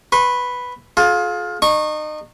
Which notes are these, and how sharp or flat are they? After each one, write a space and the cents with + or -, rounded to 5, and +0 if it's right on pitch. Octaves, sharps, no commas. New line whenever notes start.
B4 +0 C#6 -45
F4 +25 G#4 +45
D#4 -30 C#6 -15